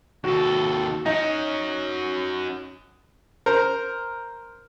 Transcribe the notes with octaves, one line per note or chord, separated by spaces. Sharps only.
D#2 F#4 A4
F#3 C#4 D#4
A#4 C5